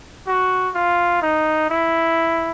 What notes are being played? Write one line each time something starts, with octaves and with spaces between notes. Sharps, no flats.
F#4
F4
D#4
E4